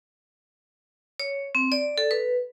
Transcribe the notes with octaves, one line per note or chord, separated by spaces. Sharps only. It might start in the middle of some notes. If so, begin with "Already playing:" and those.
C#5
C4
D5
A4
B4